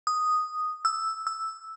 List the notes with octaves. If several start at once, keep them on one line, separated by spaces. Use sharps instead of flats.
D#6
E6
E6